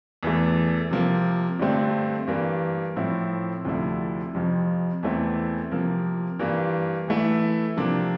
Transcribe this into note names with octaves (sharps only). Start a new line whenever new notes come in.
E2 E3 A3
C3 F3 A#3
G2 D3 A3 C4
G2 E3 A#3
A2 F3 C4 E4
D2 C3 F3 A3 E4
F2 C3 F3
E2 E3 A3 C4 E4
C3 F3 A#3
G2 E3 A#3
E3 A3 E4
C3 F3 A#3 D4